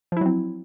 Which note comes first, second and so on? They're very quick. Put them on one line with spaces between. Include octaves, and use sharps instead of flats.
F3 E4 F#3 C4